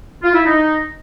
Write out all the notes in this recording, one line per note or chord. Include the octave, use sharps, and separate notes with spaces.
F4
E4
D#4